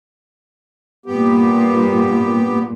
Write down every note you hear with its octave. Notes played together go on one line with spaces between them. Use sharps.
G2 A#2 B3 G4